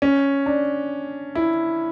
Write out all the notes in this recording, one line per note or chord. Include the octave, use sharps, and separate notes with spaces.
C#4
D4
E4